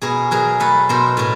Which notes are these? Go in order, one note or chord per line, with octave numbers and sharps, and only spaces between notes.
B2 G#4 A#4
F#3 G#4 A#4
A3 A4 B4
B2 A#4 C5
A2 A#4